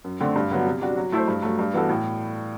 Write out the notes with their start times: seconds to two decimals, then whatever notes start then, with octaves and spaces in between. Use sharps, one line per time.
0.04 F#2
0.20 D3 A3 C4
0.36 G2
0.51 D3 F#3 B3
0.66 C3
0.81 G3 D4 F#4
0.97 F#3
1.12 A3 E4 A4 C5
1.28 G2
1.43 F#3 A3
1.59 G2
1.74 E3 B3 F#4 A4
1.89 A2